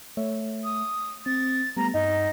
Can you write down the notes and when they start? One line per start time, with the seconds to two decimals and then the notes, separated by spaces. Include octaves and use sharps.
0.17 A3 C#5 E5
0.64 D#6
1.26 C4 A6
1.77 G3 A3 B3 A#5
1.94 G2 D#4 F#5